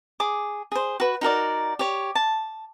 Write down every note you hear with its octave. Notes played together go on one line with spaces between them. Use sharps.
G#4 D6
G#4 C5
F#4 B4
D#4 F#4 A#4 D5
G4 C#5
A5